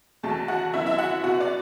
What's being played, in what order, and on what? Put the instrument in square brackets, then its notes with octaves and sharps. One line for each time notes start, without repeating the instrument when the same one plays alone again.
[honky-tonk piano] E2 B2 A3 A4 A5
F#4 F#5
F#2 D3 B3 E4 E5
E4 E5
F#4 F#5
B2 B3 F#4 F#5
D5